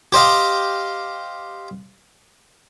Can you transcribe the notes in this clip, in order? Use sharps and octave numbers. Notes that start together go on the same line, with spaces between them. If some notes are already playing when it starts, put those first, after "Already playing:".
G4 C5 D#5 F5